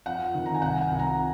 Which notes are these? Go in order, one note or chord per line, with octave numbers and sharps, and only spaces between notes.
F2 F#5
D#3
A#5
G#5
C2 F#5
G#5
C2
A#5